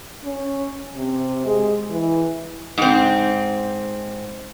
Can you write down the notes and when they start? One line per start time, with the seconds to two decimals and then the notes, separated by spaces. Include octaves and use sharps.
0.24 C#4
0.96 C3
1.46 G#3
1.90 E3
2.78 G#2 C4